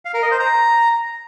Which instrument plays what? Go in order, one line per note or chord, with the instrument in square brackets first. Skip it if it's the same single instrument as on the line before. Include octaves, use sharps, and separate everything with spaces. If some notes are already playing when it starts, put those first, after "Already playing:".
[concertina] F5
A#4
D#5
C5
A#5